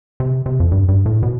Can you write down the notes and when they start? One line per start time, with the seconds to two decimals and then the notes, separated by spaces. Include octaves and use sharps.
0.20 C3
0.46 C3
0.60 F2
0.72 G2
0.89 G2
1.06 A2
1.23 B2